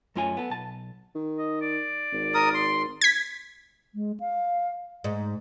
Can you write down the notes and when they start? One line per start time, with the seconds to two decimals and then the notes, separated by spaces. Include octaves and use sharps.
0.16 F#2 A3 F4 C#5 G#5
0.37 B3 A4
0.50 B1 A5
1.15 D#3
1.39 D#5
1.62 D5
2.13 G#1
2.34 A#4 D#6
2.54 C6
3.01 G#6 B6
3.95 G#3
4.20 F5
5.04 G#2